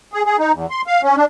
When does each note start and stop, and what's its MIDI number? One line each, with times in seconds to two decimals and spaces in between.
0.13 0.22 68
0.26 0.37 68
0.39 0.52 63
0.54 0.66 40
0.71 0.82 84
0.87 1.02 77
1.03 1.16 61
1.16 1.25 62